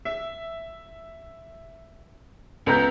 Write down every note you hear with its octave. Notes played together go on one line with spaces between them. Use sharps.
E5
C#2 B3 A#5 G6